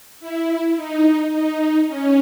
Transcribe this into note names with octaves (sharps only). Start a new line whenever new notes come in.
E4
D#4
D#4
C#4